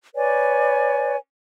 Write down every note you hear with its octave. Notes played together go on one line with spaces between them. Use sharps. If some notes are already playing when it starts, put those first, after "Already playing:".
B4 C#5 D5 G#5